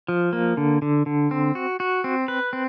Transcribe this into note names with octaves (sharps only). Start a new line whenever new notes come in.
F3
A#3
D3
D3
D3
C4
F#4
F#4
C4
B4
C4